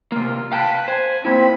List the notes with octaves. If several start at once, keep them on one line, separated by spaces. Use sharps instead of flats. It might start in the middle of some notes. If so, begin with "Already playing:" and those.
C3 A#3 F4
B4 F5 G5 A5
C5 G#5
A#3 C4 E4 B5